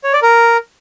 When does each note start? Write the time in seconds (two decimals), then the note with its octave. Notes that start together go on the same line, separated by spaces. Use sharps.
0.04 C#5
0.13 D5
0.22 A#4